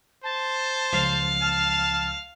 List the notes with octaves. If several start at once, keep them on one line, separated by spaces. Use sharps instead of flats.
C5 A5
C#2 F3 F5
A5 F6